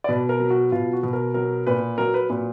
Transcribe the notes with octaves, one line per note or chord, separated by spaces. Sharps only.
D5
B2 B4
A#4
F#3
F#4
B2 F4
F#4
B2
A#4
F#3 A#4
A#2 B4
F#3 A#4
B4
A#2